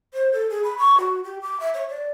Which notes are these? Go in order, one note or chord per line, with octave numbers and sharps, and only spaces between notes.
C5
A4
G#4
B5
C#6
F#4
G4
D6
E5
C#5
D5